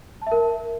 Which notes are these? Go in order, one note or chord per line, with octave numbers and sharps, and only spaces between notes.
A#4 E5 A5